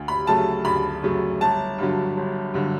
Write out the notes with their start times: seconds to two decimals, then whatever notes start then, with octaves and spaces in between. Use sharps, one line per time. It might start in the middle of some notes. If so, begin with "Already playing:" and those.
Already playing: D2
0.08 B5
0.27 C#3 F#3 A3 A5
0.65 D2 B5
1.03 C#3 F#3 A3
1.41 G1 A5
1.78 G2 D3 F#3
2.17 G1
2.54 G2 D3 F#3